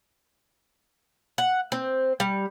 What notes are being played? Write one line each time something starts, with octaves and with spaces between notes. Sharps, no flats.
F#5
C4
G3